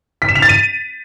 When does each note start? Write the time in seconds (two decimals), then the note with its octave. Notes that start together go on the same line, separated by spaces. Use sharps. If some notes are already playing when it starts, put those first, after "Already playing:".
0.22 B6
0.29 E7
0.35 F7
0.42 A6
0.49 D#7